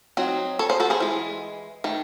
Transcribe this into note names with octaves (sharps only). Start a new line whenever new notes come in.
F#3 C4 D#4
A4 C#5
G#4 C5
F#4 A4
G#4 C5
E3 G#3
D#3 A3